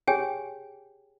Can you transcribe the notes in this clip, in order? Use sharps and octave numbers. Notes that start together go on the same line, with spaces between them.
G4 G#4 C#5 G5 G#5